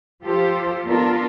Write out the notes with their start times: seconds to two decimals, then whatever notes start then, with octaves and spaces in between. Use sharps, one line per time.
0.23 F3 F4 G4 A4 C5
0.87 B3 D4 F4 A4 A#4